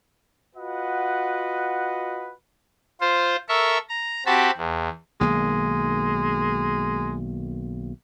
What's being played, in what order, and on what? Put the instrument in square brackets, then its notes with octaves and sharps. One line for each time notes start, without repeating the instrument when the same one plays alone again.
[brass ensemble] F4 F#4 B4 D#5 F#5
[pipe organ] F4 C5
A4 A#4 E5 C#6
A#5
C4 F#4 G4 A5 B5
E2
[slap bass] B1 D#3 A#3 [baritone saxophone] G#3